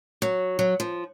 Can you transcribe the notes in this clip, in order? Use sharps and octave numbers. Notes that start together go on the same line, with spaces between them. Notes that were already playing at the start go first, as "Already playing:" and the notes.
F#3
F#3
F3